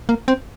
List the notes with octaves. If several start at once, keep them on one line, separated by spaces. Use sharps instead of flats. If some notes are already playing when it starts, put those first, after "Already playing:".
A#3
C4